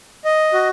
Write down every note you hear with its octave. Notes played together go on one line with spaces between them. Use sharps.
D#5
F#4